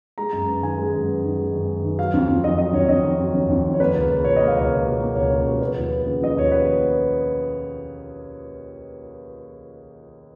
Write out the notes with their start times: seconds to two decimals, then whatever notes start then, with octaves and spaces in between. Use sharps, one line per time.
0.18 G#3 A#5
0.33 F#2
0.47 B3
0.62 D#3 G#5
0.78 G#3
0.94 F#2
1.08 B3
1.24 D#3
1.38 G#3
1.53 F#2
1.69 B3
1.84 D#3
1.98 F#3 F5
2.14 F2
2.28 F2
2.44 D#3 D#5
2.58 F#3 D#5
2.74 F2 C#5
2.89 F2 D#5
3.05 D#3
3.19 F#3
3.35 F2 C#5
3.49 F2
3.65 D#3
3.74 C#5
3.80 A#3 B4
3.95 C#2
4.10 C#2
4.24 B2 C#5
4.36 A#3 D#5
4.47 F5
4.56 C#2 C#5
4.70 C#2
4.86 B2
5.00 A#3
5.16 C#2 C#5
5.31 C#2
5.46 B2
5.61 F3 B4
5.76 D#2
5.91 B3
6.06 C#3
6.22 F3 D#5
6.37 D#2 C#5
6.51 B3 B4